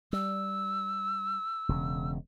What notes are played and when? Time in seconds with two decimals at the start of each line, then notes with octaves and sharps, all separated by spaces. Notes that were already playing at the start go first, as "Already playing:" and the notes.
0.13 G3 E6
1.69 E1 C#3